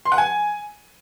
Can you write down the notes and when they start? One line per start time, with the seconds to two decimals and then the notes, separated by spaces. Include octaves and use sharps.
0.05 C6
0.12 F#5
0.18 G#5